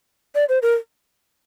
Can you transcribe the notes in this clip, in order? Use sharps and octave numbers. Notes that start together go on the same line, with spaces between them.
D5
C5
A#4